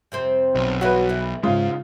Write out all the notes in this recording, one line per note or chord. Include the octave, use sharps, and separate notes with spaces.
F2 C3 C4
B1
B2 E3 F#3 F#4 B4
E3 B3
G#2 C#3 G#3 F4